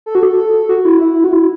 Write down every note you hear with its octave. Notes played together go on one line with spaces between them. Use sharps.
A4
F#4
A4
F#4
E4
E4
F#4
E4